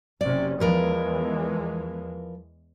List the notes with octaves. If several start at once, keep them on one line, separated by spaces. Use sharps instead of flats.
F#1 C3 C#4 D5
E2 E3 F3 G#3 A#4 B4